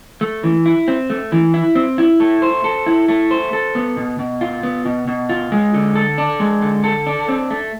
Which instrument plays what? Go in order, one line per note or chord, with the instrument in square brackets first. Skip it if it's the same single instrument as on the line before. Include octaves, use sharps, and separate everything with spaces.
[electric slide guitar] A3
E3
E4
C4
A3
E3
E4
C4
E4
A3
C5
A4
E4
A3
C5
A4
B3
B2
B2
F4
B3
B2
B2
F4
G#3
D3
A4
D4
G#3
D3
A4
D4
C4
A3